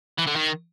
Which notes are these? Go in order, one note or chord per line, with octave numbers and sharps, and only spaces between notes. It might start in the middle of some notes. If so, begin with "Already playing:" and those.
E3
D3
D#3